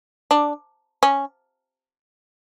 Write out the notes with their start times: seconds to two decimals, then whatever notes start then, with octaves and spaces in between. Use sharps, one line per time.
0.31 D4
1.03 C#4